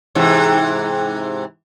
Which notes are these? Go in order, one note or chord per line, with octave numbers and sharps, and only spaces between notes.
G#2 C3 E3